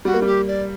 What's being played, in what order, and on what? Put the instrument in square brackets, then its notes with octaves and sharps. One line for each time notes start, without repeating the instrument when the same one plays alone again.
[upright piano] G3 [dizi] F#4
[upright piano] A#3
[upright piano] G3 [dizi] G4
[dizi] D5